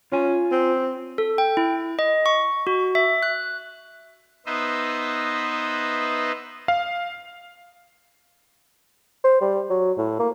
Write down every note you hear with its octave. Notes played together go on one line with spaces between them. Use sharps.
C#4 F4 G#5
C4
A4
G5
E4
D#5
C#6
F#4
E5
F#6
B3 D#4 B4 C5 D#5 E5
F5
C5
G3
F#3
A2
A#3